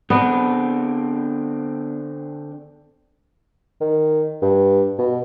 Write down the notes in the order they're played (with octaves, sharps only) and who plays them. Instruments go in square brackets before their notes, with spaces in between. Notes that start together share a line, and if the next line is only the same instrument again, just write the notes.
[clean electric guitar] D3 C4 D4 [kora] B3
[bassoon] D#3
G2
B2